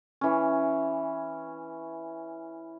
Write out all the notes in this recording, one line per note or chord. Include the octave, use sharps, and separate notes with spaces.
E3 C#4